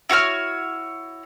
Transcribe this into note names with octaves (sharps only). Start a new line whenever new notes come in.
E4 F#4 C#5 F6